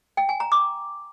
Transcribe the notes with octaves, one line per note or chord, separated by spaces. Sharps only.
G5
G#5
A#5
D6